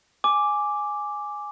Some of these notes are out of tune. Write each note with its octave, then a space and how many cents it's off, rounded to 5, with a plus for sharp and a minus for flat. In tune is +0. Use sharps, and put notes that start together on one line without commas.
G#5 +0 D6 +0